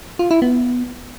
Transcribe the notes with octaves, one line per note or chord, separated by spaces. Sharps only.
F4
E4
B3